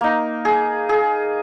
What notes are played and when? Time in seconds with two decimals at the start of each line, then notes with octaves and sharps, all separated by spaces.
0.01 A#3 D#4
0.45 G#4
0.89 G#4